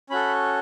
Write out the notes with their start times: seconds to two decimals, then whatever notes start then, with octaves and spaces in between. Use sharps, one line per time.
0.10 C#4 F#4 A4 B5